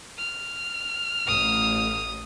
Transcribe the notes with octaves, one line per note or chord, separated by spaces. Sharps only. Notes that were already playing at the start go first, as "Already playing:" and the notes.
F6
A1 D#6